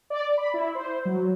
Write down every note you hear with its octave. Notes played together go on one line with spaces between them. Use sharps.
D5
B5
E4
C5
F#3